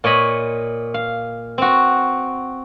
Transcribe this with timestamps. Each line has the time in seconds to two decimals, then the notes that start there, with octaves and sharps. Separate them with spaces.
0.04 A#2 C#5 D#5 B5
0.94 F5
1.58 C4 F#4